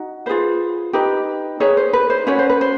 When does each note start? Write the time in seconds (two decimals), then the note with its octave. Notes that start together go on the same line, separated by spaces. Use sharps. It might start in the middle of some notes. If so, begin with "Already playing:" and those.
Already playing: D#4 F#4
0.26 F4 G#4 B4 C5
0.93 D#4 G4 B4
1.60 D#4 G#4 B4 C#5
1.77 C5
1.93 B4
2.10 C5
2.27 C#4 F#4 B4 C#5
2.39 C5
2.50 B4
2.61 C5